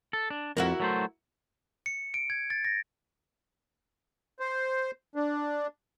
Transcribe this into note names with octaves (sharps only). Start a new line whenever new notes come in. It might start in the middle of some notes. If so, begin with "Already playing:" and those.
A4
D4
F2 E4 F#4 A#4
F#3 A3 C5
C#7
D7
G#6
A6
A#6
C5
D4